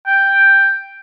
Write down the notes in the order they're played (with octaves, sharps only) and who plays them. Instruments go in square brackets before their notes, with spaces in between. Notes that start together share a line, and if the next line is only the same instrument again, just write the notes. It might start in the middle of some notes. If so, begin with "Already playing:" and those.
[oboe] G5